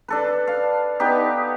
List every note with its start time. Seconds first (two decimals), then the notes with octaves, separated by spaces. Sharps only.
0.08 D4 A4 B4
0.47 F5
1.00 B3 D#4 G4